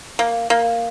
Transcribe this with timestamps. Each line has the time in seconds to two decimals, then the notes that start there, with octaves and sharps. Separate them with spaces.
0.19 A#3
0.50 A#3